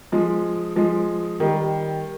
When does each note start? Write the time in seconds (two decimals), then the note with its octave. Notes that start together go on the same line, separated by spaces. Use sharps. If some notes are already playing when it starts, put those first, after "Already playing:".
0.12 F3 G#3
0.76 F3 G#3
1.40 D#3 G3